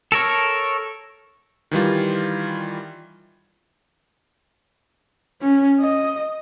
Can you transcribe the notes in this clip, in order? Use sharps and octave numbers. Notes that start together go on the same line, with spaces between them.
A4 A#4 C#5
D#3 E3 G3 F4
C#4
D#5